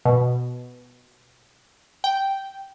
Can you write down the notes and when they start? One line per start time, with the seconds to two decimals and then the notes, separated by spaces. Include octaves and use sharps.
0.05 B2
2.04 G5